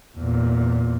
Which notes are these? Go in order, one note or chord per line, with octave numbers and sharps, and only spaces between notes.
E2 A#2